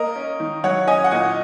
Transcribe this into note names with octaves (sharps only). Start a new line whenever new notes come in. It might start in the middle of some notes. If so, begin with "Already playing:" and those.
Already playing: A#3 A#4 D#5
C#4
D#3
F#3 C#5 F#5
C#4 D#5 G#5
F#5
A#2 D#5 G#5